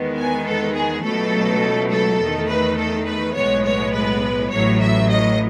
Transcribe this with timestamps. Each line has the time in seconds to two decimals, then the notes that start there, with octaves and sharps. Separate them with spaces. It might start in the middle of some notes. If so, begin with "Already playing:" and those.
Already playing: E2 D#3 G#3 B3
0.17 G#5
0.46 A4
0.74 G#4
1.03 C#2 B2 F#3 A3 A4
1.91 A4
2.20 E2 D#3 A3
2.49 B4
2.78 A4
3.06 B4
3.35 B1 A2 G#3 B3 C#5
3.65 C#5
3.93 B4
4.51 A1 A2 F#3 C#5
4.81 E5
5.10 D#5